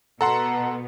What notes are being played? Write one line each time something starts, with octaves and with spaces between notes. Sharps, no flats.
B2 B3 A4 F#5 A#5 C6